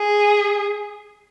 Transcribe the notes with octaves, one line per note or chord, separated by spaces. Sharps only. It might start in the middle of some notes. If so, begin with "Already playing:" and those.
Already playing: G#4